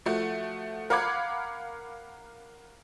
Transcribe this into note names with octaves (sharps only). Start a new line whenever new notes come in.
F3 A3 F#4
A#4 F5 F#5 B5 D6 G#6